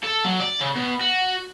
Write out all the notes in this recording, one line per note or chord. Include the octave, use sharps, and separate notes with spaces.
A4
F#3
D5
C#3
B2
F#4